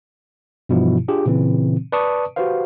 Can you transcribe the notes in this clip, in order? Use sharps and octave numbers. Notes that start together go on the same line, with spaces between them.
G2 B2 E3 F3 E4 F4
D4 F4 G4 G#4
A#2 C#3 E3 C4
B4 D5 A5 C#6 D#6
F#4 G4 B4 C5 F5